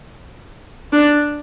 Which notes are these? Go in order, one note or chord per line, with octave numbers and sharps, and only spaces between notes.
D4